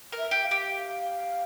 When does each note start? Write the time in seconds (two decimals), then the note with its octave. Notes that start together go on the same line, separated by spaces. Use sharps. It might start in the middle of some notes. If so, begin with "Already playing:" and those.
0.12 A#4
0.18 E5
0.31 G4
0.44 F5
0.51 G4
0.70 F5